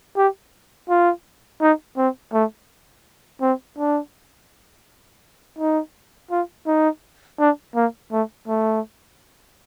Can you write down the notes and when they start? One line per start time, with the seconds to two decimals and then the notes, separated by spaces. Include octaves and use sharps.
0.17 G4
0.89 F4
1.61 D#4
1.97 C4
2.33 A3
3.42 C4
3.78 D4
5.58 D#4
6.31 F4
6.67 D#4
7.39 D4
7.75 A#3
8.11 A3
8.48 A3